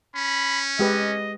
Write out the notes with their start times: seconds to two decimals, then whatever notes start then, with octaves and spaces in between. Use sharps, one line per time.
0.15 C#4 B5
0.79 G#3 G4 B4 D#5